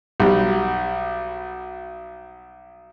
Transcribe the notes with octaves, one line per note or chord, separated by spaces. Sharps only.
B1 G3